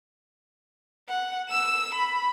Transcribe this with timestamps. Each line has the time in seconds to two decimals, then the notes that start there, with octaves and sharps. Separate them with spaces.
1.09 F#5
1.49 E6 E7
1.94 B5